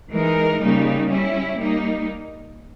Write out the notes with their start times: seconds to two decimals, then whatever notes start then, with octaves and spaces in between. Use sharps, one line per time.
0.12 E3 G#3 D#4 A#4
0.60 C#3 G3 A#3 D#4
1.08 G3 C#4 E4
1.55 G3 A#3 D#4